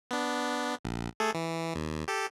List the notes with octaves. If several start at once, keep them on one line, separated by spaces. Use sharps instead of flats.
B3 D4
A#1
A3 G#4 A4
E3
D#2
G4 A4